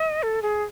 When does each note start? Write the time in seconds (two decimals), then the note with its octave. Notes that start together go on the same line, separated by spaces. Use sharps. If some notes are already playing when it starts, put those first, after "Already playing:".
Already playing: D#5
0.23 A4
0.42 G#4